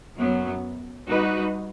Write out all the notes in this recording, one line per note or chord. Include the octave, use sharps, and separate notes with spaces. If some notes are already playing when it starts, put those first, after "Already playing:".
F#2 F#3 B3
G3 D#4 F#4 B4